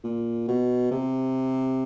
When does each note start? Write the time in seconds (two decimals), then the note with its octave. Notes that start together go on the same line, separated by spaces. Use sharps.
0.04 A#2
0.48 B2
0.91 C3